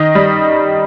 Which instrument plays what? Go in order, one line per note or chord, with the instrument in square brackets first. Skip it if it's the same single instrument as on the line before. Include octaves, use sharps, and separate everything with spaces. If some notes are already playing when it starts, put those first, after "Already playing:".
Already playing: [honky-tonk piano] D#3 D#5
G3